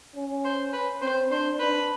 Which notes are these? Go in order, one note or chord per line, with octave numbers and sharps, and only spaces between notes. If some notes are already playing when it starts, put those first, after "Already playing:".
C#4
C5
B4
C4 C5
D4 C5
D4 B4